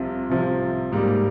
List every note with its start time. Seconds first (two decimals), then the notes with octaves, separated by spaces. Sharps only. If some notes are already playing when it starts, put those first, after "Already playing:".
Already playing: C2 C3 F3
0.29 C2 C3 F3
0.92 G#2 G3 A#3